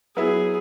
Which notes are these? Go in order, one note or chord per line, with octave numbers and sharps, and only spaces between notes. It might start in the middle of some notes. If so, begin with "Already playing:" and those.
F#3 B3 E4 G#4